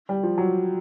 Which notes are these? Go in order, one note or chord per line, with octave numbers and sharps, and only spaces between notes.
G3
F3
F#3